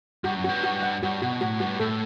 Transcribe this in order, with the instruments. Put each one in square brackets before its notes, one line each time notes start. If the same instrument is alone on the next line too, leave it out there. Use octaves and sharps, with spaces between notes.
[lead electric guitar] G2 [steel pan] F#4
[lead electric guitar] F#2
[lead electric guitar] G2 [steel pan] F#4
[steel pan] F#4
F#5
[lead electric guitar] G2 [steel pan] F#4
[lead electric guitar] B2 [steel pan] F#4
[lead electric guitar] A2 [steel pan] F#4
[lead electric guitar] G2 [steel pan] F#4
[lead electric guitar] A2 [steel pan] A4